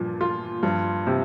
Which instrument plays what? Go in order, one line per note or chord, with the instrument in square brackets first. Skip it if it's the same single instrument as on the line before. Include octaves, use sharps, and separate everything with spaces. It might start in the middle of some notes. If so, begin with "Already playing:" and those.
Already playing: [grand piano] G2 [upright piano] A#2 F3
[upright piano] F4
[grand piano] G2 [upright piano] F3
[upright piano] C3